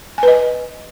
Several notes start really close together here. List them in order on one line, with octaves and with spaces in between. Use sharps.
G#5 B4 D#5